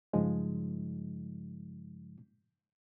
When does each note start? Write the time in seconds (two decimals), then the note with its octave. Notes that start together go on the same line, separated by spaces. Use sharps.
0.13 G2 C#3 F3 G#3 D#4